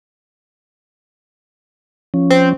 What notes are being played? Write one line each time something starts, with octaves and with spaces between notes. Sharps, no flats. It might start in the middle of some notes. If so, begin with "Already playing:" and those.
F3 C#4
C4